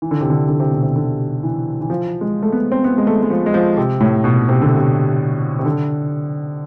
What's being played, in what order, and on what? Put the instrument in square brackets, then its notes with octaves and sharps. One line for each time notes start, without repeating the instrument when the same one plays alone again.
[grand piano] E3
D3
C3
D3
D3
C3
B2
C3
D3
E3
E3
F3
G#3
A3
B3
C4
B3
G#3
A3
G#3
F3
G#3
F3
C3
A2
B2
C3
D3
C3
C3
D3